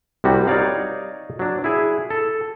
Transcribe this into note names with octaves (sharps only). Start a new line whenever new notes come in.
C2 C3 G3 F#4
D#4 C#5 D5 F5
F#3 D4
E4 G#4
A4